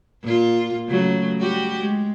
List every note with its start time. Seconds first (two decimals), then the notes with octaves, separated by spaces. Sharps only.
0.22 A#2 F4
0.88 C#3 F#3 A3
1.38 G3 F#4 G4
1.79 G#3